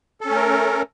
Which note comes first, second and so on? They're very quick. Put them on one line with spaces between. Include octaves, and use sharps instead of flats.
A4 C#4 A3 A#4